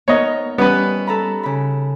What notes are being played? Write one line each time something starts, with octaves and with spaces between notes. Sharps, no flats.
B3 D#4 A#4 C#5 D#5
G3 B3 C#4 B4
A4 A#5 B5
C#3 B5